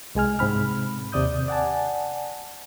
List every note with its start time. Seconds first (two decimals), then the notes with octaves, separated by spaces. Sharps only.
0.15 C2 G#3 G#5 F6
0.39 G#2 C3 C4 B5 F6
1.12 D#2 C3 D5 D#6 G6
1.48 D5 F#5 G#5 A5